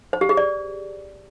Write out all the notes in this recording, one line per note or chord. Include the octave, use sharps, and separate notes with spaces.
C5
G4
G#4
D5